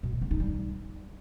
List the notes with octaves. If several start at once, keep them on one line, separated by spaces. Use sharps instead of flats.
B2
A3
B3
D#4
G3